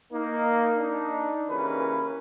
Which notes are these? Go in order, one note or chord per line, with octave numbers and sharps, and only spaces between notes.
A#3 D#4
D4 D#4
D#2 C#3 E3 C#4 A#4 B4